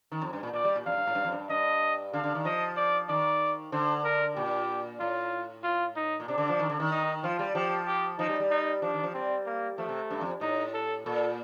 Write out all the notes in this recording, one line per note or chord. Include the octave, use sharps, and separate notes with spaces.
D#3
F2
G2
A#2
A#2 D5
G3
A#2
F2 F5
A2
G2
A2
G2
F2
G2
G2 D#5
D3 F5
D3
D#3
F3 D#5
D5
D#3 D5
D3 C5
A#4
A#2 G4
A2 F4
F4
D#4
A#2
C3 D4
D3
F3
D#3
D3
D#3
D#4
F3 F4
G3
F3 G4
G4
F3 D#4
G3
G3
D#4
F3 D4
D#3
F3
G3 C4
A#3
F3 A3
C3
G2
F2
A2 D#4
A4
A#2 A4